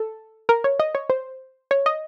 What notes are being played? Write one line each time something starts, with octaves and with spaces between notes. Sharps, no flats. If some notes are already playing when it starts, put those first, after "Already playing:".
Already playing: A4
A#4
C#5
D#5
C#5
C5
C#5
D#5